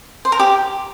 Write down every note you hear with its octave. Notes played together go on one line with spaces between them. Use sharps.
C5
A#4
G4